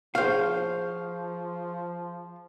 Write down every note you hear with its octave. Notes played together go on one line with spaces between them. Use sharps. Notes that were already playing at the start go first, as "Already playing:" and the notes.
F3 G#4 C5 F5 C#6